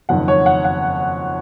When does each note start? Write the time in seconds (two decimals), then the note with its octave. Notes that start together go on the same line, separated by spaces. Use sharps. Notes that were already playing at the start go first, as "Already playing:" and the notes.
0.09 F#1 F2 D#3 F#5
0.28 C#5
0.46 F#5
0.64 F#5